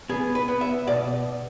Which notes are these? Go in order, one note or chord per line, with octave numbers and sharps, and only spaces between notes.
B3 G#4
B4
B3
E5
B2 D5